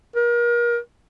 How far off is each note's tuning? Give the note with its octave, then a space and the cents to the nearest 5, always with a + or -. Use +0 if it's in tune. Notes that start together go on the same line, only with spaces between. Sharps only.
A#4 +35